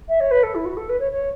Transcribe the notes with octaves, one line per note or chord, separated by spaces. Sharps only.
E5
C#5
B4
A4
E4
F#4
A4
B4
C#5
C#5